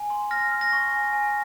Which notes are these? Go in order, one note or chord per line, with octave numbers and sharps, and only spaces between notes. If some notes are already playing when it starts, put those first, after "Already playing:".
Already playing: G#5
C6
F6 A#6
F6
A#6
C#6
G#5
G#5